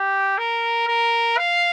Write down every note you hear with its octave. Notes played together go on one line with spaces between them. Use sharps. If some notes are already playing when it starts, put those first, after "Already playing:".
Already playing: G4
A#4
A#4
F5